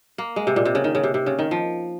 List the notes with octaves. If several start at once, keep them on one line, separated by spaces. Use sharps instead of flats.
A#3
G#3
C3
A#2
C3
C#3
D#3
C#3
C3
C3
C#3
D#3
F3